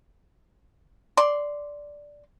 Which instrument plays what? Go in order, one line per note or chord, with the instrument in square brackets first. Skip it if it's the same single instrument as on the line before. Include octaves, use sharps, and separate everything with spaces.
[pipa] D5 C6